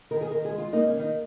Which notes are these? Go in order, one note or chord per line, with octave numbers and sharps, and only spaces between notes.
D#3 A#4
G#4
D#3 A#4
G#4
G#3
F4
A#3 D#4
C#4
D#3
D#4